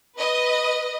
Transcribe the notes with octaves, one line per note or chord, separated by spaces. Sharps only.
B4 D#5